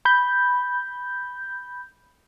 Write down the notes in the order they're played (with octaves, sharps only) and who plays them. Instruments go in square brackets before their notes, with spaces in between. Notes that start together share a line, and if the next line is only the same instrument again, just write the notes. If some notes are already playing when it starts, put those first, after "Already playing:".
[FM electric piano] B5 G6